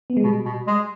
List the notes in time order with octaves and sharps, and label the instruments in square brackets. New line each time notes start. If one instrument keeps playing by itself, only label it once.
[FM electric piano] B3
G#3
[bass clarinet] B2 [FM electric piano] G3
[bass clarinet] B2
G#3